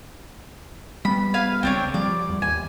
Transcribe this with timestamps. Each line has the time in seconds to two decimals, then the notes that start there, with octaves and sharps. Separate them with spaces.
1.05 G3 B3 B5
1.34 B4 F5 G#5
1.63 C#2 C4 D4 C#5
1.94 F3 G3 D5
2.29 E2
2.42 D#2 G#5